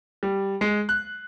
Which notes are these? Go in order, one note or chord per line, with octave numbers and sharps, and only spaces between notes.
G3
G#3
F#6